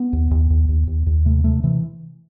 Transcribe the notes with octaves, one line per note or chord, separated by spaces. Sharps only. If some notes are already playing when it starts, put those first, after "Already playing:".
Already playing: B3
D#2
D#2
D#2
D#2
D#2
D#2
C3 A3
C3 A3
C3 E3